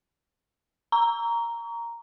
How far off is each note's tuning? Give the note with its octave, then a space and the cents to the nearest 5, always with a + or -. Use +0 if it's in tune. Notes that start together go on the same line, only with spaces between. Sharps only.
A#5 +0 C#6 +35